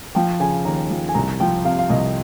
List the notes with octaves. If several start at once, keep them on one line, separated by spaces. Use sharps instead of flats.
F3 G5
C#3 G#5
D#2 A#5
F3
G#5
C2 A#5
F3 G5
C3 F5
F5
C2 D#5